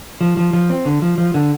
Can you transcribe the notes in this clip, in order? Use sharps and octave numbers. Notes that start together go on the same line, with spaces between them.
F3
F3
F3
C4
D3
F3
F3
D3